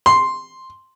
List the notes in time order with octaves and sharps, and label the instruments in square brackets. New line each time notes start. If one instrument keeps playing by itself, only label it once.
[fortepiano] C6